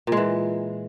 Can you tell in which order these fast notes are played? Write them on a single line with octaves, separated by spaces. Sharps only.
A#2 G#3 E3